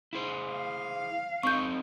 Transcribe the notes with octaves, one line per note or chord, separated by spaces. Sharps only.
E4 G#4 C5
F5
C4 D#4 A4 C#6 G6